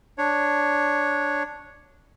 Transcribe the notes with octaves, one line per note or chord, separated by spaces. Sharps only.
D4 C#5